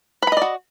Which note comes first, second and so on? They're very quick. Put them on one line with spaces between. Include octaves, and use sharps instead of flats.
B4 B5 D#5 D5 F#4